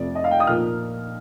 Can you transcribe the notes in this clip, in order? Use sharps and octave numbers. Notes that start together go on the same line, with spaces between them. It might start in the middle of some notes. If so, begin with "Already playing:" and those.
Already playing: F2 C3 F3 A3 D5
D#5
F5
G5
D#6
A#2 F3 A#3 F6